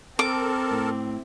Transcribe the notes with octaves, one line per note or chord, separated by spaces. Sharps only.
C4 A4 A#4 A5 D6
A2